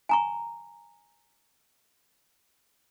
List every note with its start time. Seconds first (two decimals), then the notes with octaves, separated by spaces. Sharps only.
0.09 G#5 A#5 C#6